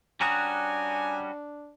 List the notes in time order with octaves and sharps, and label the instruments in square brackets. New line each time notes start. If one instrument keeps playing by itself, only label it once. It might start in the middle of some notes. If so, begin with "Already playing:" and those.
[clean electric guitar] G3 C#4 F#4 [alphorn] D4 [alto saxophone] G#5 [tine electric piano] A#5 D#6 F#6